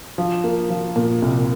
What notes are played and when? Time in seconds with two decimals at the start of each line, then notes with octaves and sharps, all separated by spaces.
0.18 F3
0.44 A#3
0.70 F3
0.96 A#2
1.22 C2